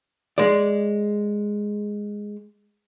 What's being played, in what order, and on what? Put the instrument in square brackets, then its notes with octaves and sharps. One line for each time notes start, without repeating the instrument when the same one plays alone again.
[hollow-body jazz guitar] G#3 D5